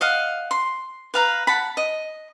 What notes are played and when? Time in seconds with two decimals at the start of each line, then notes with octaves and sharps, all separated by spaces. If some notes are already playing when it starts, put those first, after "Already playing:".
0.01 D#5 F5 F#5
0.51 C6
1.14 B4 F5 A#5
1.47 F#5 A5 B5
1.77 D#5